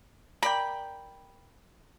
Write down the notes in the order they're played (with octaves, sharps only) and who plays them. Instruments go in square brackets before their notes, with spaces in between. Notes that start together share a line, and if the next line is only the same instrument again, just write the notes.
[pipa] A#4 D5 G5 [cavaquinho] B5